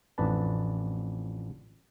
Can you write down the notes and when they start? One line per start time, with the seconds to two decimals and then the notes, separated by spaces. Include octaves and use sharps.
0.18 A1 F2 D4 B4 A5